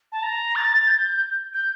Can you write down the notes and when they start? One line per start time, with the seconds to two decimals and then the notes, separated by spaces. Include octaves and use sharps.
0.12 A5
0.23 A#5
0.56 A6
0.88 G6
1.54 G6